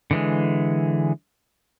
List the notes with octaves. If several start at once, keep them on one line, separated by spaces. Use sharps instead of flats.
D3 E3 G#3